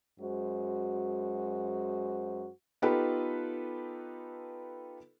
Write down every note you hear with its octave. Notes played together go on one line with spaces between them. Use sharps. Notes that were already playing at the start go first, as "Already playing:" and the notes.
F#2 G#3 F#4 C5
B3 D#4 F4 G4 A4 B4